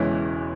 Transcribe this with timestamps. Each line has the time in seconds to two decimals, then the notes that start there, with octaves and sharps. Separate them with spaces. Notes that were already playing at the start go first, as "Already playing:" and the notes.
Already playing: E1 E2 C#3 E3 G#3 C#4 E4